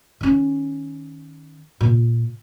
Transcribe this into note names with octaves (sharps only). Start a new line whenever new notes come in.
D#3 C#4
A#2